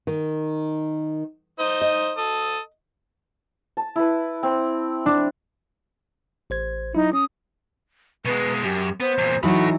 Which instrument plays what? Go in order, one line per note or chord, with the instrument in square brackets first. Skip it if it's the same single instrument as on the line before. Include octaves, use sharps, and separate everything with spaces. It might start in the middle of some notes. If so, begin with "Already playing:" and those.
[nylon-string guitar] D#3
[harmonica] D#4 C5 D#6
[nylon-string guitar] D#5
[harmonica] A4 D#6
[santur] A5
E4 B4
C4
[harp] D4
[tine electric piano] A1 C5 G#6
[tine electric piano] F#3 E4 [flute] D#4
[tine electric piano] C#4 [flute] D#6
[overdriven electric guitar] B2 G#3 [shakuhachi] B4
[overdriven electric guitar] F#2 [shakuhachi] G4
[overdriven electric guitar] B3 [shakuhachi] C5
[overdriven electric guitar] E2 A#2
[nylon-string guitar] E3 F#3 D#4 [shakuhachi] F#4 [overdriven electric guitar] A4 B5